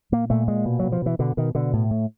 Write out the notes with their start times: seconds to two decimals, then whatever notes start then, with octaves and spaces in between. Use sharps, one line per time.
0.12 A#2 A#3
0.30 A#2 A3
0.48 A#2 G#3
0.66 B2
0.79 B2 F#3
0.92 F3
1.02 B2 E3
1.19 B2 D3
1.37 B2 D#3
1.55 B2 D3
1.73 A2
1.91 A2